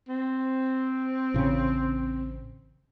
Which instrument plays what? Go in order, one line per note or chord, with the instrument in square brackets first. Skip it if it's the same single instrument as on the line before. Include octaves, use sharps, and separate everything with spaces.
[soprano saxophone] C4
[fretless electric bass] A1 C#3